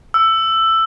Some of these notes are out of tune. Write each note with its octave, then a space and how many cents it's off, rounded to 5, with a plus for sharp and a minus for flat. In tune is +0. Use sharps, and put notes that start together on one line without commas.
E6 +10